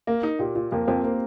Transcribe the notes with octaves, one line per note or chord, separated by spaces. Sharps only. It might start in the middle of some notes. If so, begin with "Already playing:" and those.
A#3 A#4
D#4
A#2 G4
A#2 F4
F2 A#3
F2 C4
A#3